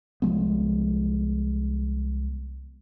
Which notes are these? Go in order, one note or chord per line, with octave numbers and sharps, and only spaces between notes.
C2 F3 G#3 B3